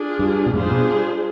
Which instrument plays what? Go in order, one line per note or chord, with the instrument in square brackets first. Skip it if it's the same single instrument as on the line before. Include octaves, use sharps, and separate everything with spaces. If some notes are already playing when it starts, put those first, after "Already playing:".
Already playing: [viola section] D4 F4 G#4
[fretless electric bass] G2
B2
[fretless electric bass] F2 G#2 [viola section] G3 D4 F4 G#4 C5
[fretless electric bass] G#2
G2 B2